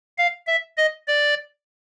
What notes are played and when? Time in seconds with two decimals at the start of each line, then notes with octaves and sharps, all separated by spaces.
0.18 F5
0.47 E5
0.77 D#5
1.08 D5